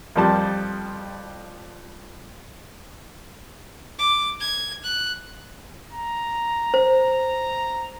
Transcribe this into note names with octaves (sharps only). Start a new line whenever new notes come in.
F2 F3 G3 A5
D6
G#6
F#6
A#5
C5